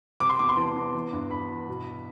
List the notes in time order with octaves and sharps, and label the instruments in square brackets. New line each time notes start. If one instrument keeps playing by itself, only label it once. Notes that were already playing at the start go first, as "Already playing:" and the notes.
[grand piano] C3 D6
C6
E2 D6
C6
E3 A5
E2
E3
G2
G2 B5
E3
B2